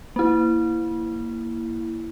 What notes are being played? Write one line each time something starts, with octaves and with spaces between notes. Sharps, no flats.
A#3 E4